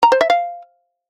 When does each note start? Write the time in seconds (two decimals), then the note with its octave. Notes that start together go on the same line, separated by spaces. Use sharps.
0.03 A#5
0.12 C5
0.21 E5
0.30 F5